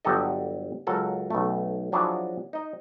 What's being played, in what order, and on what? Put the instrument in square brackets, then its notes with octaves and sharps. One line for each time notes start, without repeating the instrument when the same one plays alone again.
[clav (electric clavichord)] G1 F#3 G4 A4 D#5
C#2 F#3 C#4 A4 A#4
B1 A3
F3 F#3 D4 E4 F#4 G#4
D#4 D#5